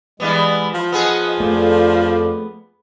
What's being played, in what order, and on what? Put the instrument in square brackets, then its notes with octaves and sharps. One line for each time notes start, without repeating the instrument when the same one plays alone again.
[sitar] E3 G3 B3 [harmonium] G#3
[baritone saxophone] F3
[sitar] B3 G#4 [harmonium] D#5 F#5
[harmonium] F2 D5 [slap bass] A3